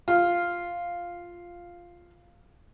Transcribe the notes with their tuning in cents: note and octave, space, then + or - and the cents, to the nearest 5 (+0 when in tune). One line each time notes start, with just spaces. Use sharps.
F4 +0